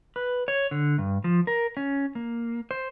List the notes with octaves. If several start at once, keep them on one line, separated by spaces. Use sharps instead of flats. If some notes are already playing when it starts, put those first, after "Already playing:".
B4
C#5
D3
G2
F3
A#4
C#4
A#3
C5